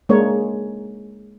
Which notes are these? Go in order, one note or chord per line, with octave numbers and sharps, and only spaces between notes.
G#3 A#3 D4 A#4 C#5